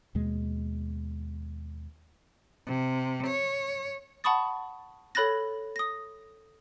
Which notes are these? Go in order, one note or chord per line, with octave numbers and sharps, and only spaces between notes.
D#2 B2 G#3
C3
C#5
F#5 A5 B5 C#6 D#6 A6
A4 C#5 B5 F#6 A6 A#6
D#6 A#6